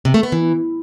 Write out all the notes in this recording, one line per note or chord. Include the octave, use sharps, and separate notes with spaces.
C3
A3
B3
E3